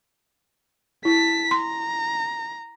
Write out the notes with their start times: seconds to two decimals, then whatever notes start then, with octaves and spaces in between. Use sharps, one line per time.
1.05 E4 A5 B6
1.51 A#5 C6